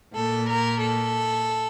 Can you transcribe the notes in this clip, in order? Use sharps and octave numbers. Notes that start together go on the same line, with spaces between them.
A#2 A4
A#4
A4